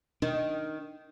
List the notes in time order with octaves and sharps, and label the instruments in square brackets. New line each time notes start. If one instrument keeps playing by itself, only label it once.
[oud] D#3 [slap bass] D4